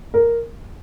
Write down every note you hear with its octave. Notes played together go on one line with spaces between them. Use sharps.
A#4